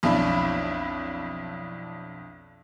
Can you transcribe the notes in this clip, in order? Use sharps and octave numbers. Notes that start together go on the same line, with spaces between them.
B1 F2 D4 E4 B5